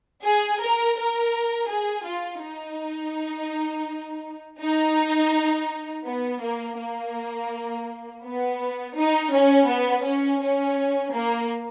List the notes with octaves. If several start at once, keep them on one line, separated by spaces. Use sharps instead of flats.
G#4
A#4
A#4
G#4
F4
D#4
D#4
B3
A#3
A#3
B3
D#4
C#4
B3
C#4
C#4
A#3